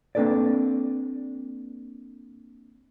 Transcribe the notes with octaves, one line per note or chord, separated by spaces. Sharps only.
A#3 C4 D4 A4 B4 D5